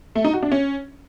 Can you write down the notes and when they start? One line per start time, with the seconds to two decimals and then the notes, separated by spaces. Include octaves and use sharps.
0.15 A3
0.25 D#4
0.34 F#4
0.43 D4
0.52 C#4